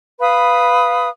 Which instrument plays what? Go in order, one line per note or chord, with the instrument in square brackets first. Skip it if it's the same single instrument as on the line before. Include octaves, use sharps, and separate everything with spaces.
[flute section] B4 F5 B5 D#6